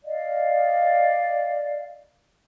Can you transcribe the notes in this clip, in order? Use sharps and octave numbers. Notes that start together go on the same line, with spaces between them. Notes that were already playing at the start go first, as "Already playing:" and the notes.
D5 D#5 F5